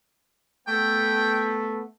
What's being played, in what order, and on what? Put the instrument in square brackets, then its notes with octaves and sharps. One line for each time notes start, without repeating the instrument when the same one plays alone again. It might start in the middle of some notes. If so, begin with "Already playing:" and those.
[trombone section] A3 B3 [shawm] G5